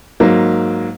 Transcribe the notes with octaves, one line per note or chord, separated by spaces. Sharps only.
G#2 F#3 A#3